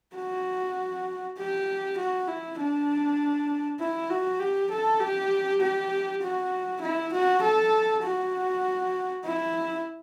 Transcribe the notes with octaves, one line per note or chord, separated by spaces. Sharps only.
F#4
G4
F#4
E4
D4
E4
F#4
G4
A4
G4
G4
F#4
E4
F#4
A4
F#4
E4